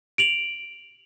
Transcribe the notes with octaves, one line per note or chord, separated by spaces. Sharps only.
D7 F7 F#7